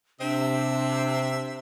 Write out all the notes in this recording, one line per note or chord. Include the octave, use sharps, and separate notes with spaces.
C3 C4 D4 E5